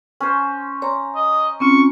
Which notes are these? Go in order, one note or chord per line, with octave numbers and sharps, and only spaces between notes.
C#4 C5
C#5 A#5 C6
D#5
C4 C#4 F4 C#6